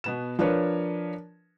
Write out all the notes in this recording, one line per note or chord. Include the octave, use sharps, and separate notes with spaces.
B2 B3 E7
F3 D4 A#4 B4 C#5